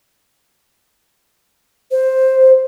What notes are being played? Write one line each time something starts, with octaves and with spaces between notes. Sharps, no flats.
C5